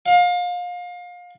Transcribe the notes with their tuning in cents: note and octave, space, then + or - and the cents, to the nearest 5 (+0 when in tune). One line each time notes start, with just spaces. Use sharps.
F5 +30